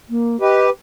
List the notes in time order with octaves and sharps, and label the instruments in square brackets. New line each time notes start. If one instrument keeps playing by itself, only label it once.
[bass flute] A#3
[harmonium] G4 B4 [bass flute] D#5